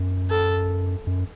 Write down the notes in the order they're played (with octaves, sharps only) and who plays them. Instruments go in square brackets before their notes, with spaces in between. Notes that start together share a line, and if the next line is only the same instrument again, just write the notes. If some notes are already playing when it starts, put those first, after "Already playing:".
Already playing: [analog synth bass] F#2
[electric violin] A4
[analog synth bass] F#2